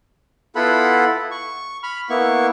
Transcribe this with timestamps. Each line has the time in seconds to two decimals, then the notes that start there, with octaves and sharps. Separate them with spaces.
0.56 B3 E4 F4 A4 F#5 B5
1.31 C#6
1.83 B5 F6
2.10 A#3 B3 E4 C#6